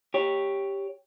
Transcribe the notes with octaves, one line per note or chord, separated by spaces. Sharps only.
G4 C#5